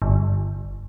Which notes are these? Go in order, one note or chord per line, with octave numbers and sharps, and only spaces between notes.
G1